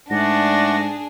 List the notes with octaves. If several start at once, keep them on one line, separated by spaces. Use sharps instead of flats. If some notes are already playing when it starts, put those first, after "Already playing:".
G#2 A3 D4 G#4 D5 F#5 A#6